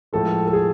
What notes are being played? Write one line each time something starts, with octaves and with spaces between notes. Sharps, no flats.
A2 F3 G#3 A4
A4
G#4